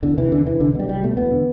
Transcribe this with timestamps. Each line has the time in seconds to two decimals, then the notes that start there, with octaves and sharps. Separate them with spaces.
0.03 E2 D3
0.18 C3 E3
0.31 E2 D3
0.45 C3 E3
0.60 C2 D3
0.75 B2 G3
0.89 C2 G3
1.03 B2 A3
1.17 E2 B3
1.31 D3